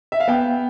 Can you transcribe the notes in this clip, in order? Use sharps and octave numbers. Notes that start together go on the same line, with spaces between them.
E5
F5
B3 G5